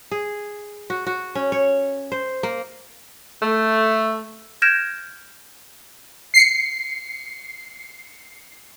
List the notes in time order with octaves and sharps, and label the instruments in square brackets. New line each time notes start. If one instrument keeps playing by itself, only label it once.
[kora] G#4
F#4
F#4
C#4
C#5
C5
A#3
[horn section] A3
[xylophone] F6 G6 G#6 A#6 D7 E7
[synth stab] C7 C#7